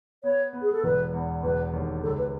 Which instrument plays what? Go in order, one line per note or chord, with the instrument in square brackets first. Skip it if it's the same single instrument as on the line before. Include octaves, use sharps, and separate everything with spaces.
[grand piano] B3 [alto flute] C#5
[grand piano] B3
[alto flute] G#4
A4
[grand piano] E1 [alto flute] B4
[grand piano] E2
[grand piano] E1 [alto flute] B4
[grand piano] D#2
[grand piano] C#2 [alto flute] A4
[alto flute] B4